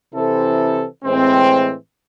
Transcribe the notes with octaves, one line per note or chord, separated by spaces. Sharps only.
C3 E3 C4 E4 A4
A2 E3 G#3 C4